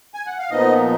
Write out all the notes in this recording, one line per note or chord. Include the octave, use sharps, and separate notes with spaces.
G#5
F#5
F5
A#2 F3 B3 D#4 D#5